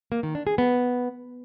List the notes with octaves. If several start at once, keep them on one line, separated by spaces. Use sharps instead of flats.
A#3
D#3
D4
G#4
B3